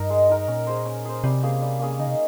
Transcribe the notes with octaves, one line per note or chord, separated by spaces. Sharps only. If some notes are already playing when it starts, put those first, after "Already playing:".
Already playing: G2 D#4 A#4
G#3
D#4 A#4
A#2 C#4
G#4 C5
C#4
G#4 C5
C3 G3
A#3 C#4 G#4
G3
A#3 C#4 G#4
C#3 D#4
C3